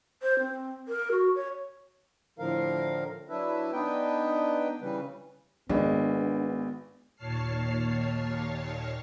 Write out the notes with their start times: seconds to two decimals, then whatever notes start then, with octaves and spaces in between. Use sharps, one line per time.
0.22 C5
0.39 C4
0.88 A#4
1.12 F#4
1.36 C#5
2.39 A2 D3 F3 A#4 F5
3.29 F#3 D4 E4 B4 E5
3.72 B3 D4 D#4 B4 G5
4.81 C#3 E3 G3 B4
5.70 G#1 G#3 B3 D4
7.16 D#2 A#2 C#5 A5 F6 C7